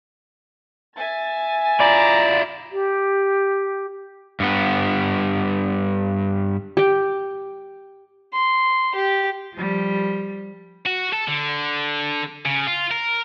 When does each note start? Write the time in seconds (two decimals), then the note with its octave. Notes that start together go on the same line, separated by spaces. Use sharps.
0.96 E5 G#5 A6
1.80 E4 F4 D5 A#5
2.72 G4
4.40 G2 B3
6.77 G4 G5
8.33 C6
8.95 G4
9.53 F3 G3
10.86 F#4
11.13 A4
11.28 D3
12.45 C#3
12.67 F4
12.91 A#4